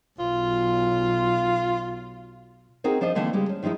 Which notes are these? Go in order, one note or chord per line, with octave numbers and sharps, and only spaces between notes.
B1 F4
C4 D#4 F#4 G#4 A#4
F3 D4 C5 D#5
D3 E3 A3 A#3 C4 D4
C#3 G3 G#3 G4
C#4
D#3 F3 G#3 D#4 E4